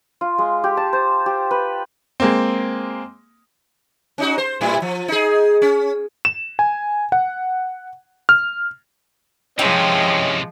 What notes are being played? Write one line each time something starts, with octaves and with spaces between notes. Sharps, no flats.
F4
G#3
G4
A5
C5
G4
B4
G#3 A#3 C4
C#4 D#4 F#4
C5
A2 G3 E4
F3
D#4 G#4
C#4
E7
G#5
F#5
F6
C3 E3 F3 G#3 C#4 D#5 E5 G5